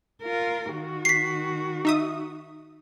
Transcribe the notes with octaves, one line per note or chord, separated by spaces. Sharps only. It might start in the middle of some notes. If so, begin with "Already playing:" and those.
F4 A#4
D#3 F#4
B6 C7
D#4 E5 D#6